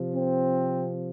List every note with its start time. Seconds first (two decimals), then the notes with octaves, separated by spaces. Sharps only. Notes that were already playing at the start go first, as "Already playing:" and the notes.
Already playing: C3 F3
0.14 C4